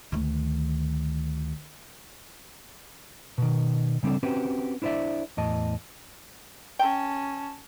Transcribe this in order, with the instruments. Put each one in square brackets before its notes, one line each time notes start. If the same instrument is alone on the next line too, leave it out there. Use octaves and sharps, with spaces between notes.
[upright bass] D2 D#3
[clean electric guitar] B2 D#3
C#3 G3 C4 D4 A4
C4 C#4 F#4 G4 B4 C5
D4 E4 C5 D5 E5
E2 A2 D#5 A5
[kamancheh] C#4 A5 [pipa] G5